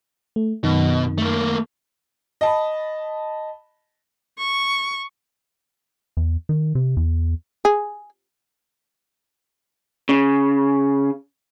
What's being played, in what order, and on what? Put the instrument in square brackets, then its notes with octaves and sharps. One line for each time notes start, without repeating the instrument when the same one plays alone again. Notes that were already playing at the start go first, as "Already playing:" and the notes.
[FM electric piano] A3
[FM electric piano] F#2 D#3 [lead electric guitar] B2
[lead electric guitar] A3 A#3
[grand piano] D#5 A5 B5
[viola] C#6
[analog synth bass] E2
D#3
C3
E2
[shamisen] G#4
[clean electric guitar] C#3